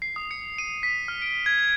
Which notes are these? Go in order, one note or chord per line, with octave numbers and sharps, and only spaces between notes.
C7
D#6
C#7
D#7
B6
F6
D7
G#6